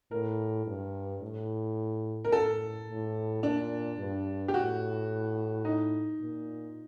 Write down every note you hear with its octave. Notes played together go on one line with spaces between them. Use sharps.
A2 A#4
G2
A2
A#4
A2 A4
A2
A#2 D4
G2
G4
A2 F#4
D#4
A#2